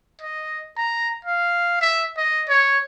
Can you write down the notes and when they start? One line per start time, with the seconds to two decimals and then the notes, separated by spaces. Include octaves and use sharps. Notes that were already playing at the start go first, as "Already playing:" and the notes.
0.22 D#5
0.78 A#5
1.25 F5
1.81 E5
2.17 D#5
2.48 C#5